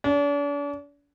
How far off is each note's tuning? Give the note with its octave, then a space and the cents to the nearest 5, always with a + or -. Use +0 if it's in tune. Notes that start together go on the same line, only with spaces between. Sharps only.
D4 -40